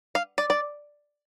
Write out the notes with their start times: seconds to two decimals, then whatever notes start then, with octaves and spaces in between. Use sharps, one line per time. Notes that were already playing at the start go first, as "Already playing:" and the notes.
0.15 F5
0.38 D5
0.50 D5